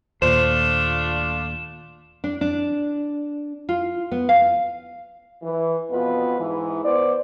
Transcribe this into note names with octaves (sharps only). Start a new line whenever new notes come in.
D#2 A#2 A3 D4 F4 C5 E7
D4
D4
F4
B3
F5
E3
F2 B2 B3 F4 B4
G#2 E3
B3 C5 D5